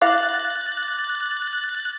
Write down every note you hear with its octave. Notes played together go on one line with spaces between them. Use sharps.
E4 F5 F#5 D6 F#6 A6 A#6